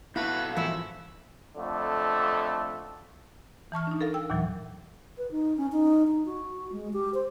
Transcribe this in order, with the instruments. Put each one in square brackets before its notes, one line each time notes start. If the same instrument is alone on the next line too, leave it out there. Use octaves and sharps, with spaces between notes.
[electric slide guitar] B2 F#4 A4 [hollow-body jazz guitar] E4 [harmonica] B4 [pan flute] F5
[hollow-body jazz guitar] G#2 E3 F3 [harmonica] E4
[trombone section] F2 D3 A3
[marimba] E3 A5 C#6 F6
D4 D#4
A4 A#4 F5
G5 E6
D#2 A#2 E3 F#3
[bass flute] B4
D#4
C#4
D#4
D#4
F#4
G#3
G4
C5